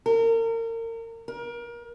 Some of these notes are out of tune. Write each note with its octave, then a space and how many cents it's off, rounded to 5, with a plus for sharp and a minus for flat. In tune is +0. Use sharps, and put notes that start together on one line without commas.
A#4 -35
A#4 +30